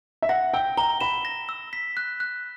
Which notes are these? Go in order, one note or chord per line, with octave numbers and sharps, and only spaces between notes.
E5
F#5 A#6
G5 E6
A#5 G7
B5 E7
A#6
E6
B6
F#6
F#6